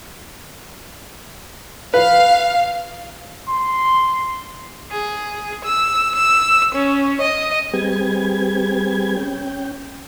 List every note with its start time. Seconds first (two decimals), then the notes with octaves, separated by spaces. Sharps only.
1.94 B4 F5
3.49 C6
4.91 G#4
5.65 E6
6.15 E6
6.75 C#4
7.22 D#5
7.73 G3 C4 G4 G#4 B4 G#6
9.17 C#4 G5